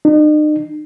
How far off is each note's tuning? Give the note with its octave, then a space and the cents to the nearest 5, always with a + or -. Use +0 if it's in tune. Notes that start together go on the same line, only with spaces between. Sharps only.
D#4 -45